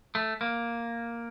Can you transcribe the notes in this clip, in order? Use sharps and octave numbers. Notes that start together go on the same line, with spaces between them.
A3
A#3